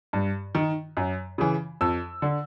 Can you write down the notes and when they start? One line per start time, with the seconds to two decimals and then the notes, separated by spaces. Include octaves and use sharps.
0.13 G2
0.55 D#3
0.97 F#2
1.38 C#3 E3
1.81 F2 E6
2.22 D3